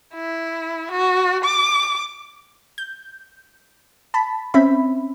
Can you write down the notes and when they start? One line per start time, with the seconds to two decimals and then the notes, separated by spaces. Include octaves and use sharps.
0.14 E4
0.91 F#4
1.44 D6
2.78 G6
4.14 A5 B5
4.54 C4 C#4 E5 B5